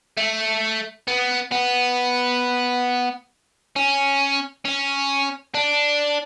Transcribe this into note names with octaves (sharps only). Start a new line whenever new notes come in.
A3
B3
B3
C#4
C#4
D4